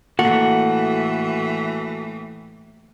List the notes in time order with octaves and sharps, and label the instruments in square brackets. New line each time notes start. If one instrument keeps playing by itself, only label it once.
[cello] A2 E3 [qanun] A#3 [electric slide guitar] F#4 A4 F#5